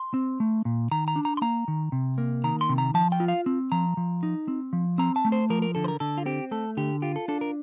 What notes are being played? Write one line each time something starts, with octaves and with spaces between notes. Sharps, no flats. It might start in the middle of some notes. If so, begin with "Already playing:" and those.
Already playing: C6
C4
A3
A#2
D#3 A#5
A#5
D4
A#5
C6
A#3 A#5
D#3
C3
A#3
D#3 A#5
C6
C3
A#5
F3 A5
G5
F4
F5
C4
F3 A#5
F3
D#4
C4
F3
C4 A#5
A5
A3
C5
F3 A#4
A#4
D3 A4
C5
A#4
D3 A4
F4
C4 G4
A3 A4
D3 G4
F4 G4
A4
D4 A4
A#4